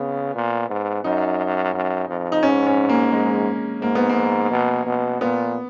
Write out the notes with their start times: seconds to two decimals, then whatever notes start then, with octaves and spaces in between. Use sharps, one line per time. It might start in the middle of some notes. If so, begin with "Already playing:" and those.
Already playing: C#3 B3
0.35 A#2
0.70 G#2
1.04 F#2 D#4
1.74 F#2
2.09 F2
2.32 D#4
2.43 G#2 C#4
2.67 C#4
2.89 A#3
3.12 G#2 G#3
3.82 G#2 A#3
3.95 B3
4.09 A#3
4.51 B2
4.86 B2
5.21 A#2 B3